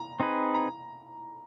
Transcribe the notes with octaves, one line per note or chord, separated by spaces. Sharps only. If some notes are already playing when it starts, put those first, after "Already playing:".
Already playing: A#5
C4 D#4 G#4 B4
A#5